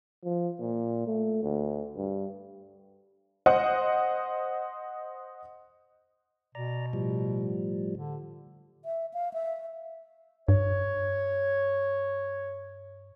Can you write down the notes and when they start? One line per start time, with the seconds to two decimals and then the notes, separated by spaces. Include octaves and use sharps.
0.24 F3
0.60 A#2
1.07 A3
1.43 D2
1.97 G2
3.46 C5 D#5 F#5
6.55 B2 D5 A#5
6.93 A2 F3 G3
7.93 D3
8.85 E5
9.14 F5
9.34 E5
10.48 G2 C#5